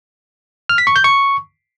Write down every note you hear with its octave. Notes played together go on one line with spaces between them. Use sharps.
F6
B6
C#6
G6
C#6